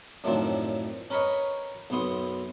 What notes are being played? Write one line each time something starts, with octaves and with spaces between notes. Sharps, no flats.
F#2 A2 D#3 F3 C4 D4
C#4 A#4 B4 C#5 D#5
B1 F#2 B3 C6 D#6